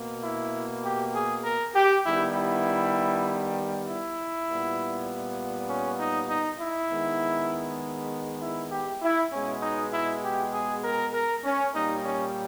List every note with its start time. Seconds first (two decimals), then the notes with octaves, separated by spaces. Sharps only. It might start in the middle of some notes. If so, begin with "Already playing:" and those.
Already playing: B2 A#3
0.24 E4
0.84 G4
1.15 G#4
1.45 A#4
1.75 G4
2.05 D#3 G3 B3 E4
2.36 E4
3.87 E4
4.48 A#2 G3 B3
5.69 C#4
6.00 D#4
6.29 D#4
6.60 E4
6.90 D#3 G#3 B3
8.42 E4
8.72 G4
9.02 E4
9.33 B2 G#3 B3 C#4
9.63 D#4
9.93 E4
10.24 G4
10.53 G#4
10.84 A#4
11.14 A#4
11.44 C#4
11.75 A#2 G3 A#3 D#4
12.05 C#4